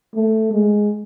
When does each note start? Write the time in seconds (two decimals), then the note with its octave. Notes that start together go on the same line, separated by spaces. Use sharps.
0.15 A3
0.52 G#3